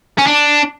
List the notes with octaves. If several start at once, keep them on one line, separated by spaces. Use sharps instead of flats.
C#4
D4